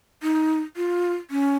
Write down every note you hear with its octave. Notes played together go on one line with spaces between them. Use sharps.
D#4
F4
C#4